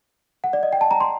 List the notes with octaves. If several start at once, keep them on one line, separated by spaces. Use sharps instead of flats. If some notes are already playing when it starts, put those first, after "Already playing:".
F#5
D5
D#5
G5
A5
A#5
C6